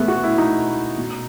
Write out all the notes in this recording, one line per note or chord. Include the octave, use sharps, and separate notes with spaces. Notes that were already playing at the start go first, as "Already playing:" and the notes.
Already playing: B2 G#3 A3 B3
F#4
E4
B2 D#4
B2